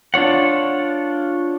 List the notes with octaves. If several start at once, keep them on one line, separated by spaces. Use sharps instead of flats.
D4 F4 C#5 F#5